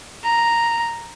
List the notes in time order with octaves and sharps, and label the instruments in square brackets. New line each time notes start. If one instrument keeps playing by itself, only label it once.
[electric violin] A#5